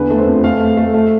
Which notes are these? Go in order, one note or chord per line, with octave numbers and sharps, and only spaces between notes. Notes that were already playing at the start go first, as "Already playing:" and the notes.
Already playing: E2 D3 B4
A3
C5
F2
A3 F5
A3
A3
A3